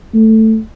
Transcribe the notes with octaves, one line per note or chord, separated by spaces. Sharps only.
A3